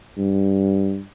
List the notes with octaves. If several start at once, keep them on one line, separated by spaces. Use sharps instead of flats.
G2